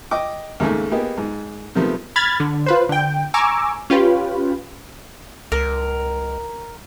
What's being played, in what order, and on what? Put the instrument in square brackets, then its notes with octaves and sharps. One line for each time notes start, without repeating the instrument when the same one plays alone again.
[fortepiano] D#5 G5 D6
D#2 G#2 C#3 A3
A#3 B3 G4 G#4 D#5
G#2
C3 D#3 F3 G3 A3 B3
[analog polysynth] B5 F6 G#6 A6
D3
F4 B4 C5
D3 G5
G#5 A#5 C#6 D6 E6
C#4 F4 G4 B4
[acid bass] C#2 [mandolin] A#4